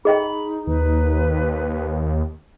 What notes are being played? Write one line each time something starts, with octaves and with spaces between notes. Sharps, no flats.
D#4 G#4 D#5 G5 B5
D#2 B4